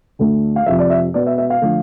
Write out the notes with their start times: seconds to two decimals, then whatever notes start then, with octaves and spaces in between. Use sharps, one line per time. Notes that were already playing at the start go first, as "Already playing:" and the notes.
0.19 D2 D3 A3
0.56 F5
0.66 F2 C3 F3 E5
0.79 D5
0.90 E5
1.14 B2 B3 D5
1.27 E5
1.38 E5
1.50 F5
1.62 D3 F3 A3